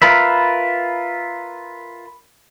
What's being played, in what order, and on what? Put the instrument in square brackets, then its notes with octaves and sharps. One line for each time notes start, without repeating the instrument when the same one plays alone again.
[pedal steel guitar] F4 A#4 B4 E5